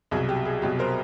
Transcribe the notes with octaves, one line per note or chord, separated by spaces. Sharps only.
C2 B2 F#3 G#4
G4
G#4
C2 B2 F#3 G4
A#4 C5